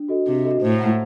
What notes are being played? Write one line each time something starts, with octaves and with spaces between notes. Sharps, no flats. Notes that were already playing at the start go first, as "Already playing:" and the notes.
Already playing: D4
F#4 A4 D#5
C3 D4
F#4 A4 D#5
A2 C5
F#5 A#5